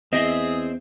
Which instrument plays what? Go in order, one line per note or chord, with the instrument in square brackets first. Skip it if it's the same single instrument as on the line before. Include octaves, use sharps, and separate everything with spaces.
[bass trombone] E2 [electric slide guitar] C4 [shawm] G#4 [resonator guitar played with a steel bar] D#5 E5